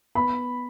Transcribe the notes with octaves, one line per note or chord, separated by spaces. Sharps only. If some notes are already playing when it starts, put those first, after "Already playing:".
B3 B5